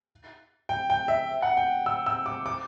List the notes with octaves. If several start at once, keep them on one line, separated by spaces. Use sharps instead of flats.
G5
G5
E5
F#5
G5
E6
E6
D6
D6